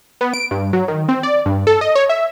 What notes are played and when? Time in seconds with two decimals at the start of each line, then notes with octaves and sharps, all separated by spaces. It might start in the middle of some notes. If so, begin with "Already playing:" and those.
0.21 B3
0.34 D7
0.51 G2
0.73 F#3
0.88 D#3
1.09 C4
1.23 D5
1.46 G2
1.67 A4
1.81 D#5
1.95 C#5
2.09 E5